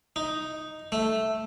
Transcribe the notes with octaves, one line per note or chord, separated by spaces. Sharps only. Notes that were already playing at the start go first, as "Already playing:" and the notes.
D#4
A3